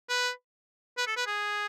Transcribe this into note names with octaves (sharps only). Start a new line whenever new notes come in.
B4
B4
A4
B4
G#4